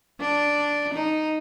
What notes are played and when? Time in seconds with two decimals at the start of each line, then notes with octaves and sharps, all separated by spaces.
0.20 D4
0.94 D#4